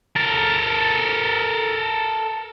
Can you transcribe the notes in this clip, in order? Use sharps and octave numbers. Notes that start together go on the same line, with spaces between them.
A4 A#4